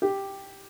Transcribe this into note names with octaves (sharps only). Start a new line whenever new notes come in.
G4